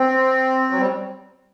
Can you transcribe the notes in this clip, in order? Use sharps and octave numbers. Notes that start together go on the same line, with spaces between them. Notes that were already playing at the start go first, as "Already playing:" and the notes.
Already playing: C4
F#3
G3